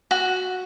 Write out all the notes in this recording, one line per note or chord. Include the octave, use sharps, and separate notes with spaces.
F#4